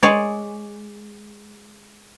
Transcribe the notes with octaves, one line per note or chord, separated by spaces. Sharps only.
G#3 C#5 D5